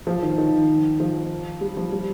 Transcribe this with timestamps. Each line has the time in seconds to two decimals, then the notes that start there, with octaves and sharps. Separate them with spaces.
0.07 F3
0.23 D#3
0.38 D#3
1.00 F3
1.61 G3
1.77 F3
1.92 G3